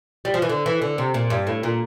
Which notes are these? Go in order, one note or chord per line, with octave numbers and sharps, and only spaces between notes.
G3
F3
E3
D3
E3
D3
C3
A#2
G2
A2
A#2